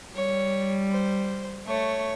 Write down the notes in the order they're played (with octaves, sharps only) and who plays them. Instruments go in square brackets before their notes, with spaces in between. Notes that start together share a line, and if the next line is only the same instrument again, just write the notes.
[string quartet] G3 [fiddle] C#5
[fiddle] C5
[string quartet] A3 [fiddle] C#5